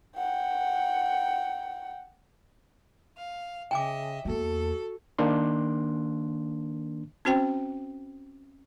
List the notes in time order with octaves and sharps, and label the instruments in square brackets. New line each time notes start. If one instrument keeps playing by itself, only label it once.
[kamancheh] F#5 G5
[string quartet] F5
[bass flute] C#3 [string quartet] D#5 E5 [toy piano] G5 G#5 D6
[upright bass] E2 A#3 [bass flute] F#4 [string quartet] A4
[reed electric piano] D#3 A#3 D4 C6
[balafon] C4 C#4 F#4 C5 G5